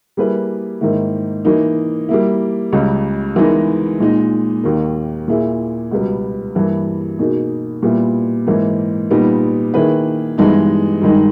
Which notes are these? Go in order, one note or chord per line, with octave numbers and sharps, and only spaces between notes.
G3 A#3 E4 G#4 B4
G#2 D#3 A#3 E4
E3 A#3 D#4
G3 A#3 E4
C#2 C#3 G3
E3 G#3 B3 D#4 A#4
A#2 G#3 D#4
D#2 D#3 A#3
A#2 A#3 E4 G#4
C#2 B2 G3 B3
G2 E3 A#3
B2 A#3 D#4 G#4
A#2 G3 B3 E4
G#2 E3 A#3
A#2 G3 B3 D#4
D#3 A#3 E4 G#4 B4
G2 E3 G#3 B3 D#4
G2 D#3 G#3 D#4